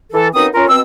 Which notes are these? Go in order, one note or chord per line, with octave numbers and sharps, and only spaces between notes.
E3 A4
F#2 B3 C4 D#4 D#6
C#4 F4 A#4
B2 C4 E6